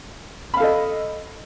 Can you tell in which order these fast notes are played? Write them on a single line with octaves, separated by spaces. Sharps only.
B5 F5 A4 D#5